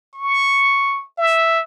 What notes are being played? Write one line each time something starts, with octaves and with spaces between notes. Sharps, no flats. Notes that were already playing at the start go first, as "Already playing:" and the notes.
C#6
E5